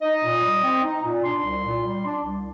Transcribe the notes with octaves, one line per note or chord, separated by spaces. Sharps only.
D#4 D#5
A#2
G3
C4
D#4
A#2
D4 C6
C2
A#2
G3
D4
C2